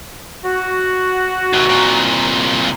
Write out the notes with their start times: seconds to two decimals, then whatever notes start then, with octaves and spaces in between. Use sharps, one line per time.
0.44 F#4
1.53 D#2 C3
1.69 C2 A#2